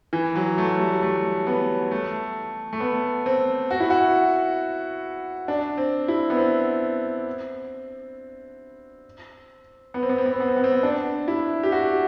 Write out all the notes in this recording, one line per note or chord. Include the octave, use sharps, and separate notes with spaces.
E3
F#3
A3
G3
A3
B3
A3
A3
B3
C4
F#4
E4
F#4
D4
C4
E4
B3
C4
B3
C4
B3
C4
B3
C4
B3
C4
B3
C4
B3
D4
E4
G4
F#4